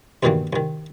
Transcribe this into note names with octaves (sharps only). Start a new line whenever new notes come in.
C2 G2 B2 D#3 E3 A#3
C2 D#3